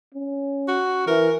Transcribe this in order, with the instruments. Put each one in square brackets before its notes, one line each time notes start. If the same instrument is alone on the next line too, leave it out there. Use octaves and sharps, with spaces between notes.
[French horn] C#4
[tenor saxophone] F#4
[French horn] E3 [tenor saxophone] A#4